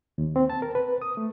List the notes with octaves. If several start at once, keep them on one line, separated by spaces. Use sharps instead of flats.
D#2
C4
A5
A#4
B4
D#6
A3